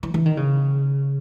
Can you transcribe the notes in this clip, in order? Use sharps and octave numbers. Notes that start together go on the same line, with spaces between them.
E3
E3
D#3
C#3